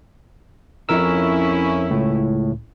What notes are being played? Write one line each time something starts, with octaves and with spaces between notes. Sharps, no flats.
F2 C#4 E4 A#4 E6
C#2 A2